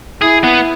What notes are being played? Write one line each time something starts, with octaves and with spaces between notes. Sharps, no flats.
E4 G#4
B3